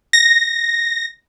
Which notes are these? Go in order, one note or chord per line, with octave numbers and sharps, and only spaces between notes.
A#6